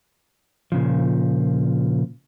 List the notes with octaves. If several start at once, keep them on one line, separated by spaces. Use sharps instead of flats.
A#2 C#3 F3